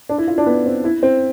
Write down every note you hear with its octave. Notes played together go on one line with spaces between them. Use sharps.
D4
E4
F4
D4
B3
C4
E4
C4